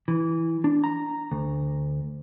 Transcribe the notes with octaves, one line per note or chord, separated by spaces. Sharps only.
E3
D4
A#5
D2